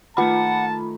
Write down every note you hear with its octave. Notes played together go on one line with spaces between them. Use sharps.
D#3 A3 F4 F#5 A5 B5